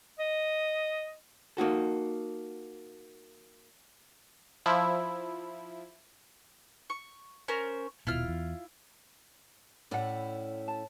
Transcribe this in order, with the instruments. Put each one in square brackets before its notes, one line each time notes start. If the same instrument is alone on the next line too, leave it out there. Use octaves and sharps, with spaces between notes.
[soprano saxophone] D#5
[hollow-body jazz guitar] A#3 D#4 F#4 A4
[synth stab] F3 E4
[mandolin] C#6
C#4 A#4 C5
[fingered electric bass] D#1 B2 [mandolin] E4 F4 F6
[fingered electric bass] E2
[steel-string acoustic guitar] A2 C#4 E4 [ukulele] D5 F#5
[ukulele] A5